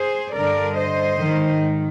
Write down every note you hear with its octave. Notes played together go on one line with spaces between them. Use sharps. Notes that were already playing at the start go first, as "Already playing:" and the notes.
Already playing: G#4 C5
G2 D3 A#4 D5
C5 D#5
G#2 D#3